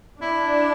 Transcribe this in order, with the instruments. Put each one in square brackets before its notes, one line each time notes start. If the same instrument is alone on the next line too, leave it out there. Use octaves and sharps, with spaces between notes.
[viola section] D4 [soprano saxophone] E4